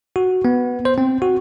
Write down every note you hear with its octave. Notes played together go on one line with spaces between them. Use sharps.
F#4
B3
C5
C4
F#4